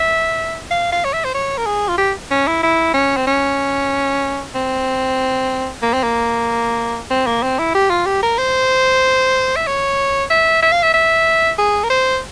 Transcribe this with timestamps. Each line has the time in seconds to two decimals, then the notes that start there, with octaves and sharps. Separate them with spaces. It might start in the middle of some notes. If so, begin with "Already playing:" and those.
Already playing: E5
0.71 F5
0.92 F5
1.05 C#5
1.13 E5
1.25 C5
1.34 C#5
1.58 A#4
1.66 G#4
1.88 F4
1.98 G4
2.31 C#4
2.47 E4
2.63 E4
2.94 C#4
3.17 C4
3.27 C#4
4.55 C4
5.82 A#3
5.94 C4
6.03 A#3
7.11 C4
7.27 A#3
7.43 C4
7.59 E4
7.75 G4
7.90 F4
8.06 G4
8.23 A#4
8.38 C5
9.56 E5
9.67 C#5
10.30 E5
10.62 E5
10.72 F5
10.83 E5
10.94 E5
11.58 G#4
11.84 A#4
11.90 C5